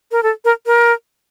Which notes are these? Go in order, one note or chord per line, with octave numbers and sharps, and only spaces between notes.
A#4
A4
A#4
A#4